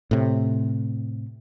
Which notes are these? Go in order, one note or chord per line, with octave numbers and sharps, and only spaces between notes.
A2 C3